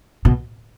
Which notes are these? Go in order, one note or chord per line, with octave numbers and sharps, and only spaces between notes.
B2